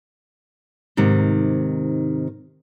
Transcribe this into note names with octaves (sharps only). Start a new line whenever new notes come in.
G#2 C3 D#3